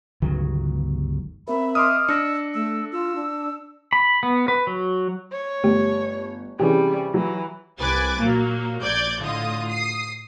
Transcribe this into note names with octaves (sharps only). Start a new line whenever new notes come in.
G1 C#2 D#3 F#3
C4 A#4 E5 B5
D#5 C6 D6 D#6 F6
D4 E6 A#6 C#7
A3 E6
F4 E6
D4
B5
B3
B4
F#3
C#5
G1 A3 G4
C3 E3 G3 C#4 G4 G#4
E3 F#3
C2 B4 G#5 D6 A6
A#2 F#3 A#3
A#1 D5 D6 G6 G#6
A2 D3 F4 D#5 D#6
D#6 C7